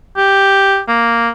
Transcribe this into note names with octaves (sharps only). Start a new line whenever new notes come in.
G4
A#3